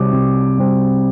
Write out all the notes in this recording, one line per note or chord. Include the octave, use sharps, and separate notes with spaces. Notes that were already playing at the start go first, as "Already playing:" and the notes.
Already playing: C3 G3 C4 D6
C3
G3 C4